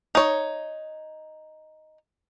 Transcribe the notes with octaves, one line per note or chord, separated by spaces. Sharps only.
D#4 C#5